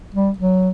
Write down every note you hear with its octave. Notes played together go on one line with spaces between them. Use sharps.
G3
F#3